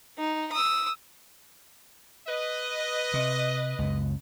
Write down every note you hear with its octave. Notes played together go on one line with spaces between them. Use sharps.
D#4
D#6 E6
B4 D#5
C3
C#2 F#2